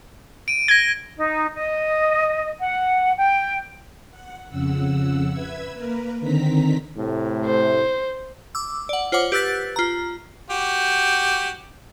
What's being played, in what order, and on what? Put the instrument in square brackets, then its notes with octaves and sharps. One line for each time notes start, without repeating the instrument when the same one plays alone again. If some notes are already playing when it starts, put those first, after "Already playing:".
[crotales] D7 D#7
[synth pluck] G#6 [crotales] A#6 G7
[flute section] D#4
D#5
F#5
G5
[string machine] F#5
F2 C#3 F#5 E6
B4 E5 E6 G#6
A#3 A#4 B4
D3 D#3 C4 A#5 B6
[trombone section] A2 C3 A3
[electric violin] C5
[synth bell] D6 E6
D5 F#5
F4 C5 C#5 F#5 D6
G4 B4 E6 F#6 A6 B6
F4 A#5
[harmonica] F#4 G4